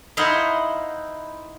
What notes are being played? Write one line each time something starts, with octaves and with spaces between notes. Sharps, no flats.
D#4 E4 C5 F5 F#5